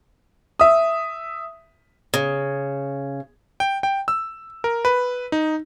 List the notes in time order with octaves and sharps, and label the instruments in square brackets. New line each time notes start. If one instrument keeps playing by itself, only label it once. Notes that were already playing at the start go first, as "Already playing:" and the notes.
[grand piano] E5 D#6
[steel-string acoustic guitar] C#3
[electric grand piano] G5
G5
E6
A#4
B4
D#4